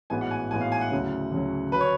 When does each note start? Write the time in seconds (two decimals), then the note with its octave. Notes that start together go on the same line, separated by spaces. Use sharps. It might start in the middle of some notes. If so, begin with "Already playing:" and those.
0.10 A1 G#2 G#3 B3 F#4 G#5
0.21 F#5
0.31 G#5
0.51 A1 G#2 G#3 B3 F#4 G#5
0.61 F5
0.72 G#5
0.81 F#5
0.91 D2 C#3 F#3
1.31 D2 C#3 F#3
1.72 D3 F#3 B4
1.81 C#5